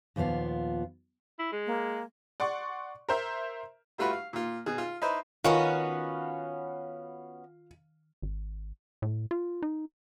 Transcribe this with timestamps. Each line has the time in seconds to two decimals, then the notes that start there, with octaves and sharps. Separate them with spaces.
0.16 D#2 A#2 F3 B3 F5
1.39 E4
1.52 G#3
1.66 A#3
2.40 D5 F#5 C6 C#6
3.09 A#4 C5 E5
3.98 G3 A3 F4 F#4 B4
4.13 F5
4.33 A#2 F4
4.66 B2 G#4
4.78 F4
5.02 D#4 E4 B4 C5
5.44 D#3 B3 C#4 F4 F#4 F5
8.22 G#1
9.02 A2
9.31 F4
9.62 D#4